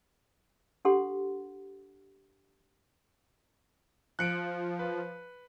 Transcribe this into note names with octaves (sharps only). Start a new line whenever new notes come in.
D4 G4 A4 F#5 C6
F3 F#6 C#7 D7
B4